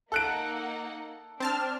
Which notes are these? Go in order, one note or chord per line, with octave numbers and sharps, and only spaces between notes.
A#3 D#4 A4 F#5 F#6 D7
C4 D4 A5 F6